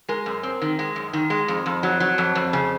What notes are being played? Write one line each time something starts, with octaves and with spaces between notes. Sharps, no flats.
G#3 A#4
F#2
C4
D#3
G#3
F#2
D#3
G#3
F2
F2
F#3
F#3
F2
F2
C#3